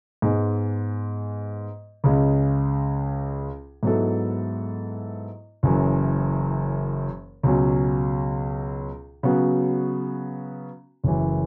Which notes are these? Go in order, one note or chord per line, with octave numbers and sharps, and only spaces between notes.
G#2 G#3 B3
C#2 C#3 G#3
G#2 F#3 B3 E4 A4
F#1 F#2 E3
C#2 B2 F#3 C#4
C#3 F#3 B3 F#4
F#1 F#2 E3